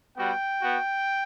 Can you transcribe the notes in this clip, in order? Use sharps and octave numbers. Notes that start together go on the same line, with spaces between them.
G3 B3 F#4 G5
B3 F#4